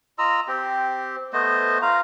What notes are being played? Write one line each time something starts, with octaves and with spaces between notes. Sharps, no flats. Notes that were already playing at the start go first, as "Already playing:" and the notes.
F4 D#5 A#5 E6
C4 G4
A3 B3 C5 D#5
F4 F5 A#5